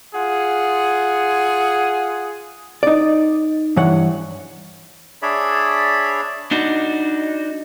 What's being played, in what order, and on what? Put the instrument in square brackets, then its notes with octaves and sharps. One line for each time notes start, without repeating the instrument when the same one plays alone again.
[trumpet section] F4 G#4 F#5
[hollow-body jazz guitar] D#4 D5
G2 E3 C#5 F#5
[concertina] D4 G#4 C#5 D5 E5 B5
[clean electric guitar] D4 D#4 F#4